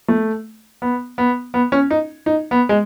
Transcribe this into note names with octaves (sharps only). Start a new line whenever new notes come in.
A3
B3
B3
B3
C#4
D#4
D#4
B3
G#3